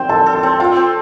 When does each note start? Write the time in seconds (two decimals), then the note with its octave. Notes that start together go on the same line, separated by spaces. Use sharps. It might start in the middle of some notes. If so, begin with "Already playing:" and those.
Already playing: C4 C5 G5
0.09 A4 A5
0.26 A4
0.35 C6
0.43 C4
0.60 F4 G5
0.77 C4